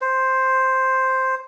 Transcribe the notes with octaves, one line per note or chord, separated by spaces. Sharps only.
C5